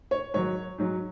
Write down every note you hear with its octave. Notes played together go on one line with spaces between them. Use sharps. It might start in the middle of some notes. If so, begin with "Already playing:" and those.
C#5
G#2 D#3 F#3 C#5
G#2 F#3